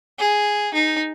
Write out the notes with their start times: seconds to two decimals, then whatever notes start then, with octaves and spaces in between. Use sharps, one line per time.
0.19 G#4
0.74 D#4